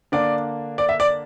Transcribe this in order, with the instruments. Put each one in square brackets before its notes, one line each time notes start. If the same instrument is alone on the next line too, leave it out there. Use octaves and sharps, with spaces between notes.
[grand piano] D3 A#3 D4 D5
D5
E5
D5